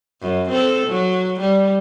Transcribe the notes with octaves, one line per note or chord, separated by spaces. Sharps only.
F#2
C4 A4
F#3
G3